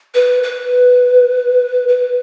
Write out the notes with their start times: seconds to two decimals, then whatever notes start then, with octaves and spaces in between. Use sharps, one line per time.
0.15 B4
0.43 B4
1.88 B4